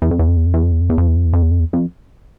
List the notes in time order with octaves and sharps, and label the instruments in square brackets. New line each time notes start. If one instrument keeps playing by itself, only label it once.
[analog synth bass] E2
F2
E2
F2
E2
F2
E2
F2
E2
F2
E2
F2
E2
F2
E2
F2
E2
F2
E2
F2